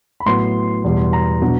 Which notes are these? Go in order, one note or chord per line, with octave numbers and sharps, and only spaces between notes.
B5
A2 F#3 B3 C6
E2 B2 G3
A#5
B2 F#3 B3 D4